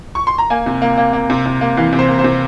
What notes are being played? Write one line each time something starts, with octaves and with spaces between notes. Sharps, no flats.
C#6
C6
A#5
A#3 G#5
C3
A#3
A#3
A#3
C3
C3
A#3
E3 F5
C3
C5
A#3
C5
C3